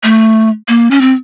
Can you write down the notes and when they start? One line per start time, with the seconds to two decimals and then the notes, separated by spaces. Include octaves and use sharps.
0.03 A3
0.68 A#3
0.91 C#4
1.01 C4